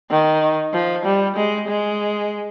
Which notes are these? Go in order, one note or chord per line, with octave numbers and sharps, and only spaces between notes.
D#3
F3
G3
G#3
G#3